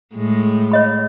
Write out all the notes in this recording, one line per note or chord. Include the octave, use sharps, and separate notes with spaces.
A2 G#3
C#5 D#5 B5